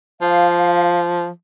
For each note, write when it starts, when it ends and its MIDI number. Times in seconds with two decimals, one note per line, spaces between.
0.21 1.29 53
0.21 0.99 77